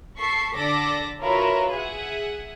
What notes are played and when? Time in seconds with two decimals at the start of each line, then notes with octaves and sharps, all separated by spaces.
0.18 A4 C#6 B6 C7
0.55 D3 A4 D5 D6 A#6 B6
1.21 F4 F#4 A#4 B4 C#5 E5
1.71 G#4 E5 F#5